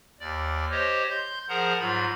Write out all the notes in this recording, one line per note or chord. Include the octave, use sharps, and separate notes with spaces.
D#2 D5
G4 C5 C#5 D#5
C6 G6
F3 G#4 A#4 C5 F#5 A#5
G#2 F#3 F4 B5